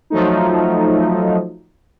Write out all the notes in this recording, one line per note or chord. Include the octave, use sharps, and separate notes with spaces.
F3 F#3 A3 D#4